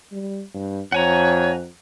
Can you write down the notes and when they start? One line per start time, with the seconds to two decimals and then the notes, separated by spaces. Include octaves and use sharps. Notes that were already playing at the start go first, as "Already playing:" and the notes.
0.12 G3
0.54 G2
0.92 F2 C#5 F#5 G#5 A#5